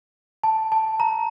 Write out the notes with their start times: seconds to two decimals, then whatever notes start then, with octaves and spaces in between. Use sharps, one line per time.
0.44 A5
0.72 A5
1.00 A#5